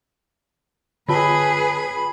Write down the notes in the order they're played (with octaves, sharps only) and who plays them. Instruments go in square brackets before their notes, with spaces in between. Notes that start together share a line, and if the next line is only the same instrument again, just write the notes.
[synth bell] D3 F4 A5 [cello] G#4 B4 [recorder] B5